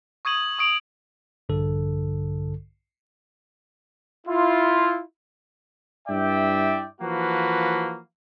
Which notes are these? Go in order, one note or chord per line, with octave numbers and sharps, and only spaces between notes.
C#6 D#6 G#6 D#7 F#7
C#6 D#6 D7 F7 F#7
A#1 G2 D3 A4
E4 F4
G2 E4 D5 E5 G5
E3 F3 A#3 F#4 B4